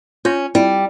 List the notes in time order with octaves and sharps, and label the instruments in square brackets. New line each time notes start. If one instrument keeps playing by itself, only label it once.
[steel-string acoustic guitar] C#4 [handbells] F4 G6 A#6
[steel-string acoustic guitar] G3 [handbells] C4 E4 F4